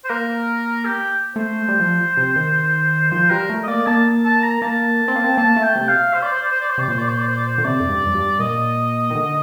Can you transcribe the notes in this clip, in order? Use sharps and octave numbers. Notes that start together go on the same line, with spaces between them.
C5
A#3 A#4
G4
A3 C5
G3
F3
C3
D#3
F3 C5
G3 A#4
A3
D#5
A#3 D5
A#3 A5
A5
A#5
A#3 A5
C4
A#3
C4
A#3 A5
A3
G5
C3
F5
C5
D5
C5
D5
C5
D5
C5
C3 D5
A#2 C5
D5
C5
D5
C5
D5
C5
D3
C3 D5
F2
G2
F2
G2
A#2 D#5
D#3
D3